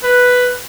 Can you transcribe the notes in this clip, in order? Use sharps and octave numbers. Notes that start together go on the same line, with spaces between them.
B4